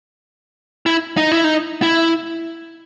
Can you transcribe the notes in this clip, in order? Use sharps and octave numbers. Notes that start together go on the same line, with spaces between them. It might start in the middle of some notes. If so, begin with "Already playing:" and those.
E4
D#4
E4
D#4
E4